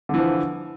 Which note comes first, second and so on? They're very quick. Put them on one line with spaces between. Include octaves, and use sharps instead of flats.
D3 E3 F3